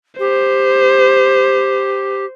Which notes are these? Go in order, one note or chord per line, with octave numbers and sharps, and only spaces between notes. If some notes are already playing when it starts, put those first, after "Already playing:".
G4 C5